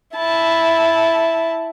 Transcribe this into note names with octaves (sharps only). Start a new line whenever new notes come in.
E4 A5